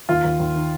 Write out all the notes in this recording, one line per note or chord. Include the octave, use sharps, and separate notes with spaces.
D#2 F4
D#2
D#2
D#3